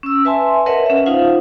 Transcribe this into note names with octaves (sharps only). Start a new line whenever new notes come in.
C#4 E6
B4 E5 G#5 A5 C6
A#4 B4 C#5 D#5 E5 F#5
C#4 E5
D#4 F4 C5 F5 F#5